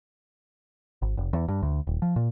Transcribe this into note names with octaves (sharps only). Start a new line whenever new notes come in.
G#1
F1
E2
G2
D2
D#1
F3
A#2